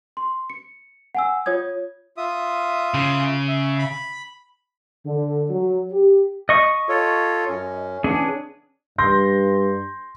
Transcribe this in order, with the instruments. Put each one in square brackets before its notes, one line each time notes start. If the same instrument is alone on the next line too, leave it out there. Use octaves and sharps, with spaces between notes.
[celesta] C6
C#7
F#5 G#5 E6
F4 C#5 D#6 G#6
[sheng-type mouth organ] F4 E5 D#6
[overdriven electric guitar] C#3
[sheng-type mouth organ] E5
B5
[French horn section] D3
F#3
G4
[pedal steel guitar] D#5 C#6
[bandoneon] F4 A4 C#5
F#2 C#4
[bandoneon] E3 B3 [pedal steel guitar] C#4 D4 G#4
[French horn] G2 [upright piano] C6 G6 A#6